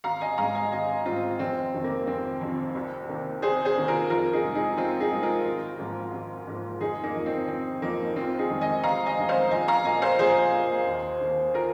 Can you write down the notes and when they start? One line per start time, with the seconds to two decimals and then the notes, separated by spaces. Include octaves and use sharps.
0.04 G#1 F5 A#5
0.21 D#5 G#5
0.38 G#2 G#3 F5 A#5
0.55 D#5 G#5
0.72 G#1 D#5 G#5
1.05 G#2 G#3 C4 F4
1.39 F1 C4
1.74 F2 C3 D#3
1.84 A#3
2.07 F1 C4
2.41 F2 C3 D#3
2.75 C2
3.09 C3 D#3 A#3
3.42 C2 G#4 C5
3.65 G#4 C5
3.76 C3 D#3 A#3
3.88 F4 A#4
4.10 F2 F4 A#4
4.33 D#4 G#4
4.44 C3 G#3
4.55 D#4 G#4
4.77 F2 C4 F4
5.00 D#4 G#4
5.12 C3 G#3
5.23 F4 A#4
5.45 G#1
5.79 G#2 F3 A#3
6.13 G#1
6.47 G#2 F3 A#3
6.81 F1 D#4 G#4
7.03 A#3 D#4
7.15 F2 F3 A#3
7.26 C4
7.48 F1 C4
7.82 F2 F3 A#3 D#4
8.16 F1 C4 F4
8.38 D#4 G#4
8.50 F2 D#3 G#3
8.61 D#5 G#5
8.83 F1 F5 A#5
9.06 D#5 G#5
9.18 F2 D#3 G#3
9.29 C5 F5
9.51 A#1 D#5 G#5
9.68 F5 A#5
9.85 A#2 A#3 D#5 G#5
10.02 C5 F5
10.19 A#1 G#4 C5
10.52 A#2 A#3
10.86 D#2
11.20 D#3 A#3
11.54 F4 A#4